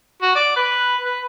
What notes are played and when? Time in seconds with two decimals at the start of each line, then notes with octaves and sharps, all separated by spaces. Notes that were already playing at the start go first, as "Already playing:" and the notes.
0.21 F#4
0.35 D5
0.56 B4
1.04 B4